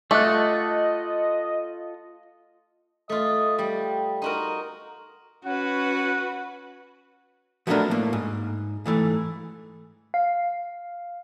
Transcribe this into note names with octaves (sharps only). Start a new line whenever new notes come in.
A3 F4 A4 D#5 F#5 D6 F#6
A3 F4 D#5
G3 G5
D#4 F4 F#4 A#4
C#4 F#4 B4 F#5
F3 F#3 A3 B3 D4 A#4
A2 A#3
G#2
G#2 E3 A3
F5